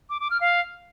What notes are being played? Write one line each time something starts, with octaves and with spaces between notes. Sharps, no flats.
D6
D6
F6
F5